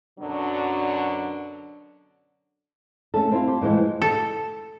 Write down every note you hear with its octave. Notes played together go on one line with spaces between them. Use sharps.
F#2 B2 D3 F#3 D4
A3 C#4 A4
C4 E4 F4
G4
A2 E3 F3 G#3
A4